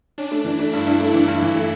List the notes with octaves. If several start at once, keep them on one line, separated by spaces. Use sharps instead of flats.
C#4 D4
A3
E3
A3
G2 E4
G2
A3
E3
G2 E4
E3
A3